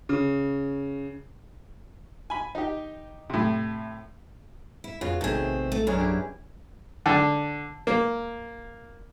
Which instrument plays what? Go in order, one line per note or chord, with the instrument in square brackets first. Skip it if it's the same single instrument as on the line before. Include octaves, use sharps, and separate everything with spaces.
[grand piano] C#3
[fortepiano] G#5 B5
D#4 G4
A2 C3
[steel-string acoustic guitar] E4
[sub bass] F2 [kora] C#3 B3 F#4 [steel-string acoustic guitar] F4
[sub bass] A#1 [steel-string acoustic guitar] C3 C4 [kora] D#3 A3 G#4
[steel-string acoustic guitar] A3
[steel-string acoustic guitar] F#2 D4 [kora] B3 C#4 G#4
[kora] E4 G4 G#4
[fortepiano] D3
A#3